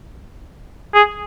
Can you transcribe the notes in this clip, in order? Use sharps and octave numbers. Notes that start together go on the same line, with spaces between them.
G#4